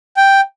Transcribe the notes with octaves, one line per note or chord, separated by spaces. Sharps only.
G5